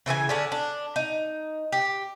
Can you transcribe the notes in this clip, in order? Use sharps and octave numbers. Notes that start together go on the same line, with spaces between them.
C#3 E3 G#4 G#5
D3 C#4 D4
D4
D#4
G4